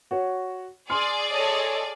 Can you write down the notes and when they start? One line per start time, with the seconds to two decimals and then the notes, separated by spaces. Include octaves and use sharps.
0.11 F#4 C#5
0.90 G#4 D5 C6 F6
1.31 A4 C#5 D#5